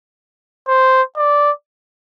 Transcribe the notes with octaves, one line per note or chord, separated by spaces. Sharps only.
C5
D5